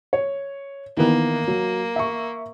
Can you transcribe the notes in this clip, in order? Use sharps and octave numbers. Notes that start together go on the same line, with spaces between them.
C#5
D#3 E3 A#3 B3
F#3
E5 C#6